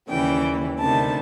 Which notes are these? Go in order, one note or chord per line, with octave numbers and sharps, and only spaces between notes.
D#2 C#3 E3 G3 G5
D2 C3 D#3 G3 A5